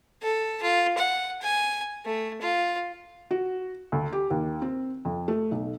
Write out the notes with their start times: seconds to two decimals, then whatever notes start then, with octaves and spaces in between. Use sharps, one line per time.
0.22 A4
0.63 F4
0.98 F#5
1.42 G#5
2.06 A3
2.41 F4
3.31 F#4
3.92 D2
4.13 G4
4.30 D#2
4.62 C4
5.05 F2
5.28 A3
5.51 B1